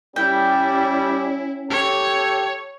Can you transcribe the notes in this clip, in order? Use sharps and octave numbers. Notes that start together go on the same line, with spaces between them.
G3 C#4 E4 G5
G4 A4 C#5